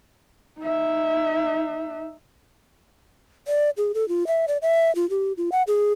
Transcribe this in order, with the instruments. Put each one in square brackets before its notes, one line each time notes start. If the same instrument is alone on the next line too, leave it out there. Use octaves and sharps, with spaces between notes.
[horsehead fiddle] D#4 E5
[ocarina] D5
G#4
A4
F4
E5
D5
E5
F4
G4
F4
F#5
G#4